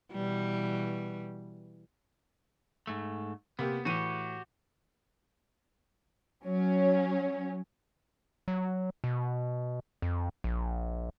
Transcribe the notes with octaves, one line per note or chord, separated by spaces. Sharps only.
B2 E3 G3
G#2 A3
C3 A#3 B3 G4
A2 E3 F#4 G4 D#7
F#3 C#4
F#3
B2
F2
A#1